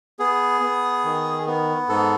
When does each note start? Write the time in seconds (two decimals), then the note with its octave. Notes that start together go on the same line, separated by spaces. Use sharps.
0.19 B3 G#4
0.61 B3
1.04 D#3
1.47 B3
1.89 G#2 A4